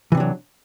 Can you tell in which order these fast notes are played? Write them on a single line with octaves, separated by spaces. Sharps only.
E3 C3 D4 F#3